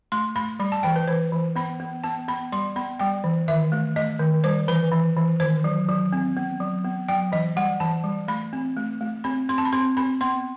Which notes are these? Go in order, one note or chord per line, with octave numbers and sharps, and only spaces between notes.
A3 C6
A3 B5
G3 B5
A5
E3 G5
B4
E3 C5
E3
B3 B5
B3
B3 A5
B3 B5
G3 C6
B3 B5
G3 G5
E3
D#3 E5
A3
A3 D#5
D#3
G3 C5
E3 B4
E3
E3
D#3 C5
F#3
F#3
C4
B3
F#3
B3
F#3 G5
E3 D#5
G3 F#5
E3 A5
G3
A3 B5
C4
A3
A3
C4 B5
C4 C6
A5
B5
C4 C6
C4 B5
B3 C6